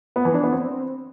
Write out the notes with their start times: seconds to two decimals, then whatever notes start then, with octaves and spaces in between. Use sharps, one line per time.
0.16 B3
0.25 E3
0.34 D4
0.43 B3
0.53 C4